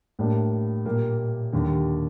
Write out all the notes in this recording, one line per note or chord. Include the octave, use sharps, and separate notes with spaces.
A2 G3 A#3 D4
A#2 G3 A#3
D#2 D3 G3